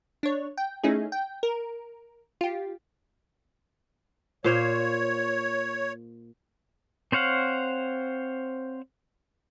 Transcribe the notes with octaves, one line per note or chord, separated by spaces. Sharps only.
D4 C#5
G5
A3 C#4 D#4 E4 G#4
G5
A#4
F4 G4
A#2 C5 C#5 F5
C4 C5 C#5 F5 F#5